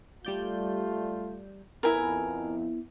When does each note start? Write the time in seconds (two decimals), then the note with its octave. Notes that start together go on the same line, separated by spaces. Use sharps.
0.25 G3 A3 F4 D5 G6
1.83 F2 B3 E4 A#4 G#5